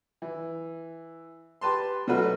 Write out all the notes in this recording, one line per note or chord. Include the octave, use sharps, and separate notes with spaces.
E3
G4 B4 A5 C6
B2 F#3 A3 F#4 B4 F6